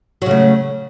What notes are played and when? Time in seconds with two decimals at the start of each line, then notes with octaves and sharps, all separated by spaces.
0.22 F#3
0.26 C#3
0.31 A3